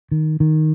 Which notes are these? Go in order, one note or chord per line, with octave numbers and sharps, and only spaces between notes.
D#3
D#3